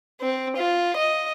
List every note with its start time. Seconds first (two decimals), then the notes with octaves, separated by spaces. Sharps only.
0.21 C4
0.57 F4
0.97 D#5